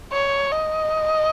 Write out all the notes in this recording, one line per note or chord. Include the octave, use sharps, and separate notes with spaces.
C#5
D#5